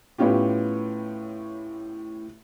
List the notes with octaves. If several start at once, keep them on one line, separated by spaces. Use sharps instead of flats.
A2 B3 C#4 F4 G4